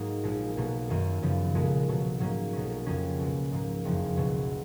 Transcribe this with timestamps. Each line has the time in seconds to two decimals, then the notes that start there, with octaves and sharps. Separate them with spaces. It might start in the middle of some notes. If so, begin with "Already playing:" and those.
Already playing: G#2 F#3 A#3 D#4
0.23 A#1 A#2 F3 G#3
0.57 B1 B2 A#3
0.89 F#2 D#3 A#3
1.22 F#2 C#3 F3 B3
1.55 B1 A#2 G#3
1.88 B1 B2 F#3
2.20 G#2 F#3 A#3 C#4
2.53 B1 B2 A#3 C#4
2.86 F2 C#3 F3 A#3 C#4
3.19 C#2 B2 G#3
3.52 G#2 F3 A#3
3.85 F#1 F2 C#3 F3
4.17 C#2 B2 F#3